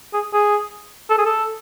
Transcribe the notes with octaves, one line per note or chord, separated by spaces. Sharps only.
G#4
G#4
A4
G#4
A4